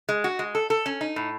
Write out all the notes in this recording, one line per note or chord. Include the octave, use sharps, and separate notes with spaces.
G#3
F#4
G#3
A4
A4
C#4
D#4
A2